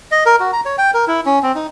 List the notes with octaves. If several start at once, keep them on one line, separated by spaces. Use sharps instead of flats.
D#5
A#4
F#4
A#5
C#5
G5
A#4
E4
C#4
C4
D#4